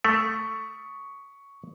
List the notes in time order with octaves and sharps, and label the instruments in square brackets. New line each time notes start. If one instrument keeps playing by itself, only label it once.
[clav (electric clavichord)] A3 [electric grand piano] C#6 D#6 B6